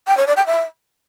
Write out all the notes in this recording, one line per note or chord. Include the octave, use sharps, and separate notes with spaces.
G5
C#5
D5
G5
E5